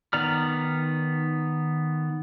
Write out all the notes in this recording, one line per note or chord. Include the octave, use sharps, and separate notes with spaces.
D#3 B3 D5 A#5 F6